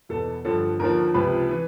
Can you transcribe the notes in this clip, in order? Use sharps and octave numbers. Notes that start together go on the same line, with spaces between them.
E2 B2 A4
G2 D3 F3 A4
D#2 D3 F3 A#4
C#2 C3 F3 B4
E3